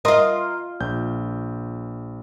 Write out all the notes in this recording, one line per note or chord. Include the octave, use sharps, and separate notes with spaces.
F4 A#4 D#5 C6
A#1 G6